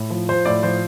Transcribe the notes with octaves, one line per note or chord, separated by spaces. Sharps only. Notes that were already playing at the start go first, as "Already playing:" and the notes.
Already playing: A2
F3
F3 C5
A2 D5
F3 C5